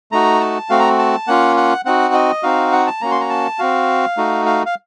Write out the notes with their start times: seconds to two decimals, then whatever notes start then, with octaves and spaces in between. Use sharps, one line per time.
0.12 A3 D#4 F#4 A#5
0.40 A5
0.70 A3 C4 F#4 F5
0.79 A#5
0.99 A5
1.27 A#3 C#4 F4 F#5
1.57 F#5
1.85 C4 D#4 F#4 F#5
2.14 D#5
2.43 C4 D#4 F#4 F5
2.72 F#5
2.86 A5
3.01 A#3 C#4 F#4 A#5
3.11 C6
3.20 A#5
3.30 A5
3.59 C4 F#4 F5
4.17 A3 D#4 F#4
4.46 F5
4.66 F5